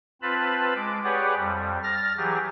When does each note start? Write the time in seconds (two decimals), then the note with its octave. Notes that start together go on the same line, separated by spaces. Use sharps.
0.22 C4 F4 B4 A5 B5
0.75 G#3 D6
1.04 G4 G#4 B4 C#5 D5 F#5
1.37 F2 G3
1.84 F6 A6 A#6
2.17 E3 F#3 G4 G#4